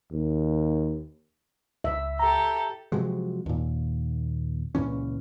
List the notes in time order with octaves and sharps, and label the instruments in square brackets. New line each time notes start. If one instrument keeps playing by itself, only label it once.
[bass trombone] D#2
[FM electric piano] C#2 [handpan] E5
[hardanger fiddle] G4 A4 [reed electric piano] A#5
[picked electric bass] C3 F3 F#3 G#3
D#2 A#2
C#2 A#2 E3 C#4